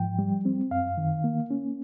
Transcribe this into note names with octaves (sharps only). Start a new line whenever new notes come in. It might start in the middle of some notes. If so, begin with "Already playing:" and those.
Already playing: G#2 F3 G5
G3
C4
F#2 F5
D#3
A#3
C#4